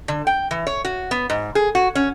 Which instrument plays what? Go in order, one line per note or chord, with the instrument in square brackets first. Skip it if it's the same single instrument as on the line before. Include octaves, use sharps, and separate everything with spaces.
[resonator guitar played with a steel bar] D3
G5
E3
C#5
F#4
B3
G#2
G#4
F#4
C#4